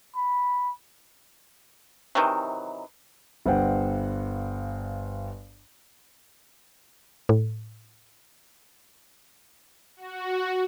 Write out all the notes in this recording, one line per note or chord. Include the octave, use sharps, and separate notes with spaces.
B5
C3 D#3 E3 F#3
G1 G2 C5 F#5 G5
A2
F#4